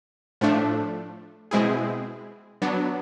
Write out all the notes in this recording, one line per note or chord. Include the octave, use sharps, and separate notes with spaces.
A2 F3 A3 D4
B2 G#3 C4 E4 G#4
F#3 B3 D4